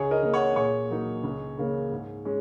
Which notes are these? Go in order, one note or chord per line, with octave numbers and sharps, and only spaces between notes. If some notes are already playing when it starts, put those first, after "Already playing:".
Already playing: C#2 G#4 C#5
A#4 D#5
C#3 A#3
C#5 F#5
A#2 G#4 C#5
F#3 A#3 D#4
C#2
C#3 A#3 C#4
G#2
G#3 C#4